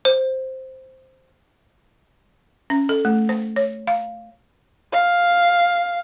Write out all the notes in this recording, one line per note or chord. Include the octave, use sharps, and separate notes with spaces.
C5
C#4
A4
A3
C5
C#5
F5
F5